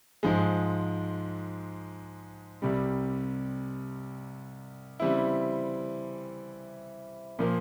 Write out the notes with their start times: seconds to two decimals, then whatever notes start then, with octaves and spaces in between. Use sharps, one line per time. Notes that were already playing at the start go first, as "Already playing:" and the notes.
0.23 G#2 F3 G#3
2.62 C2 C3 G3
5.00 C#3 E3 G3 C4 E4
7.39 A#2 F3 A#3